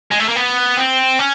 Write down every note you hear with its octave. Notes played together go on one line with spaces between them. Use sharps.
G#3
A3
A#3
B3
C4
C#4